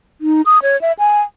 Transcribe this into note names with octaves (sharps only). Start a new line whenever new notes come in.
D#4
D#6
C#5
E5
G#5